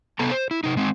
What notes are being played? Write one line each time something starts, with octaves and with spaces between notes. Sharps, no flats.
C3 B3 A4 A#5
C5
E4
C3 D#4
G#3 C4 D#4